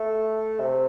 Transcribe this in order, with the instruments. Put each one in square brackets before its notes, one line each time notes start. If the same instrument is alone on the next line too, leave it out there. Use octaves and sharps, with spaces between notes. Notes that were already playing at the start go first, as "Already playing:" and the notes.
Already playing: [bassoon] A3
C3